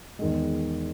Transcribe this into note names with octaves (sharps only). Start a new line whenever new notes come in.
E2 D#3 G#3